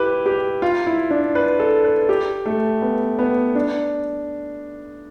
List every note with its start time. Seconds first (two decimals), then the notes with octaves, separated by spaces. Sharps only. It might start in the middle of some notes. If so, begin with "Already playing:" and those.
Already playing: E4 G4 B4
0.26 G4
0.62 F4
0.87 E4
1.11 D4
1.35 B4
1.60 A4
1.84 B4
2.09 G4
2.45 A3
2.82 B3
3.19 B3
3.55 D4